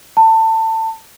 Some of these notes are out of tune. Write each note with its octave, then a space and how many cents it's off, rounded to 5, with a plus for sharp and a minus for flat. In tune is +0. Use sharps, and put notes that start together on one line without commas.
A5 +25